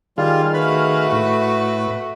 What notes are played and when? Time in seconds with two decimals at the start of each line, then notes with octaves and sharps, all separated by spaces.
0.18 D#3 G3 F4 G#4 F5
0.54 A3 F#4 B4 B5
1.12 A2